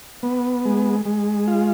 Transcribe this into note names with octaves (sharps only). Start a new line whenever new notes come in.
B3
G#3
G#3
F4